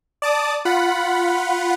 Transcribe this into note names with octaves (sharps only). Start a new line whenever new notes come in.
D5 A5 D6 D#6
F4 F#5 B5